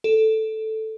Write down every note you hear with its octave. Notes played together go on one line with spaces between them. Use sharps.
A4